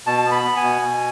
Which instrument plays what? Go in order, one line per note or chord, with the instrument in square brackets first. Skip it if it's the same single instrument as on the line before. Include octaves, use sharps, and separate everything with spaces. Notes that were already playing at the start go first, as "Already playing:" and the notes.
[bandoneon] B2 A5
B3
B5
B3
G#5
B2
B2